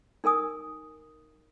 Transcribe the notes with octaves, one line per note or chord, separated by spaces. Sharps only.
D#4 A#4 G#5 D#6